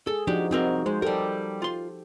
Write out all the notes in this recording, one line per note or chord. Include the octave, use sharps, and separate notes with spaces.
G#4 A4
F3 D4 D#4 F#4 G4
C2 C4 D#4 F#4 A#4
G#3 C5
G3 G4 A4 A#4
F4 C6